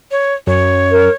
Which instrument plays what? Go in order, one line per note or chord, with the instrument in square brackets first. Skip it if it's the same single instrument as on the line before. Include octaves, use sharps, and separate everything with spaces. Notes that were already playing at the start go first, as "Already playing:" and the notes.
[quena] C#5
[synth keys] F#2 [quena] C#5
[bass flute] A#4